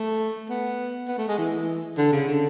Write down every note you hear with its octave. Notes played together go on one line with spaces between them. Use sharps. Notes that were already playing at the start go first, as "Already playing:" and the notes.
Already playing: A3
B3
B3
A3
G#3
E3
D3
C#3
D3